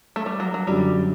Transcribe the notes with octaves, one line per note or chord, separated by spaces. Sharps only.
A3
G3
F#3
F#3
F#2 D3 F#3 G3